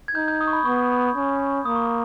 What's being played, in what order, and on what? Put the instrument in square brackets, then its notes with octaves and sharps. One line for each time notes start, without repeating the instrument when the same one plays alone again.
[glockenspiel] G#6
[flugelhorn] D#4 [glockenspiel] G6
[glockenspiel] G6
D#6
C#6
B5
[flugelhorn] B3 [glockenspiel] C#6
[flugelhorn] C#4
[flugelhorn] A#3 [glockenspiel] D#6
[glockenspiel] C#6
D#6